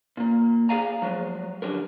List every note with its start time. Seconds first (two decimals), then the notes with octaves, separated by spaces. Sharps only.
0.17 A#2 A#3
0.69 G#4 A4 D5 F5 G#5 A#5
1.02 F3 F#3 G#3
1.62 D3 F#3 G3 A#4